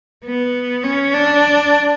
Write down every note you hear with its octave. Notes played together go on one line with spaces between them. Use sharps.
B3
C#4
D4